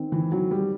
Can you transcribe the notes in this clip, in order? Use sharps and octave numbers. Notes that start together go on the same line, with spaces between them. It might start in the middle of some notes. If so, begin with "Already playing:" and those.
Already playing: D#3 C4
E3
F#3
G3